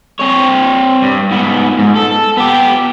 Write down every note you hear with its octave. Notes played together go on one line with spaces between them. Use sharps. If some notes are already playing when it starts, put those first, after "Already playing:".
C4 C#5
G2
G#2 B3
G#2
A4
B3 G4